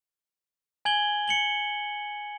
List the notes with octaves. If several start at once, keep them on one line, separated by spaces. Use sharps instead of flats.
G#5 G#6 F#7 G7
C#7 F#7 G7